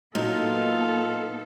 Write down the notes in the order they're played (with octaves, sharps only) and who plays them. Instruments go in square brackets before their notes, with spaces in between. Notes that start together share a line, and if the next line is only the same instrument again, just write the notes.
[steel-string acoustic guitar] A#2 [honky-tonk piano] F#3 D#4 [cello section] B3 A4 [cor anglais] F4